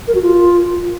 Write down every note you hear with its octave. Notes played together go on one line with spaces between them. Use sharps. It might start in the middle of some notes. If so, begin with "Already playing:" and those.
A#4
F#4
F4